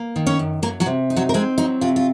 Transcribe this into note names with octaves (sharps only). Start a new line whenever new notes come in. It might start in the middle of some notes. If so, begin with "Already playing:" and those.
Already playing: A#3
D#3
C#4 C#5
F#2
F#3 A#3 A#4
F#3 F#4
C3
D#4
F#3 F#4
A#4
G#3 C4 G#4
F#3 D#4
C3 F4
F4